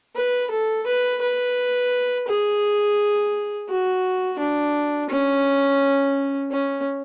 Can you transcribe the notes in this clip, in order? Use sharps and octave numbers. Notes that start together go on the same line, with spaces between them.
B4
A4
B4
B4
G#4
F#4
D4
C#4
C#4